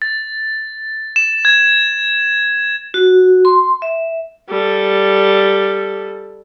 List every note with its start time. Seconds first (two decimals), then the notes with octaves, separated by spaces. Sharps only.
0.02 A6
1.16 E7
1.45 G#6
2.94 F#4
3.45 C6
3.82 E5
4.49 G3 A4